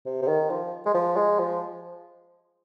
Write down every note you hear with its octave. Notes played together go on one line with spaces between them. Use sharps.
C3
C3
D#3
F3
G#3
F3
G#3
F3